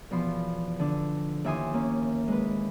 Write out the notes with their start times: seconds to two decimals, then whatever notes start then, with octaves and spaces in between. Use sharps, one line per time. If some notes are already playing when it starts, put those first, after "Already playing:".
0.11 E2 B2 F3 B5 C6
0.79 D3 D4
1.44 D#2 E4 E5 G#5 C6 D#6
1.74 A#3 C#4
2.28 G#3 B4